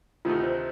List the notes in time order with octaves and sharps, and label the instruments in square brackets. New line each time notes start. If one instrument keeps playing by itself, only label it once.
[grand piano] D2 C3 D#3 A3 D#4 [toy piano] F4
[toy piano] C5